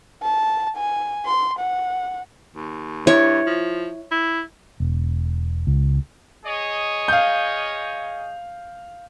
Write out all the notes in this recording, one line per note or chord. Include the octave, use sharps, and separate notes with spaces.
A5
G#5
C6
F#5
D#2
G2 E4 C#5
F3
E4
E1
C#2
G#4 C#5 D#5
F5 G6